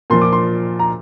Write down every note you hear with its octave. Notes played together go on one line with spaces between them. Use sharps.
A#2 F3 C6
D6
C6
A#5